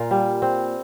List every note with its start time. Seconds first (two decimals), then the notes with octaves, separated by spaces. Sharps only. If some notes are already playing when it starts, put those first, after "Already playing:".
Already playing: A#2 F4 A#4
0.11 G3
0.42 C4